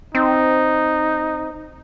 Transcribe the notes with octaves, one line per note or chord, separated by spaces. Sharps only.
C4 D#4